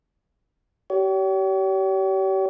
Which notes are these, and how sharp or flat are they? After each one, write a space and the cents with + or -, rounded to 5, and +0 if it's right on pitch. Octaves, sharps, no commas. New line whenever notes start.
G4 -35 C#5 +40